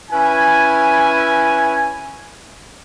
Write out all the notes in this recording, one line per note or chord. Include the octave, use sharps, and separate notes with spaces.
C#4 E4 B4 G#5